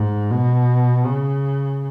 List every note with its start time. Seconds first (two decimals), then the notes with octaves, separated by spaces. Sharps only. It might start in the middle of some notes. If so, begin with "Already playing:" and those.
Already playing: G#2
0.31 B2
1.06 C#3